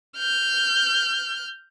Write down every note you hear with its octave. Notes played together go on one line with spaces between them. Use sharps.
F6 G6